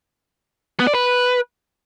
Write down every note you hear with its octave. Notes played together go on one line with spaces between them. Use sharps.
B3
D5
B4